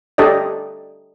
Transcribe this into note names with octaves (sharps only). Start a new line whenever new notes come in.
D4 G4 A4 C#5 D#5